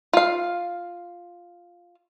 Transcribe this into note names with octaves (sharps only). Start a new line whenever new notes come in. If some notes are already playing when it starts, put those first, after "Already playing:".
F4 F5